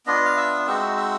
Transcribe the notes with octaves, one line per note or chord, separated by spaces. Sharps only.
B3 D4 F4 D#5
F5
E5
G#3 C4 D#4 F#4 E5
E5